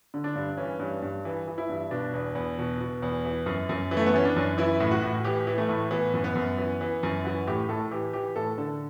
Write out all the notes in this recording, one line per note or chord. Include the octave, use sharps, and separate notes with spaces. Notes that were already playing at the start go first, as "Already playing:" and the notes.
D3
D4
G2
E3 C#4
G2
G2
E3
E3
E4
G2
B2 D4
E2
E2
B2
B2
E2
E3
F#2
F#2
E3
A3
B3
E3 C#4
D4
F#2
E3 E4
A2
F#4
A2
E3 G4
E3
A3
A2
E3 B3
F#2
B3
F#2
E3
E3
F#2
E3 F#4
A2 G4
A2 A4
E3 G4
E3 G4
A2 A4
D3 A4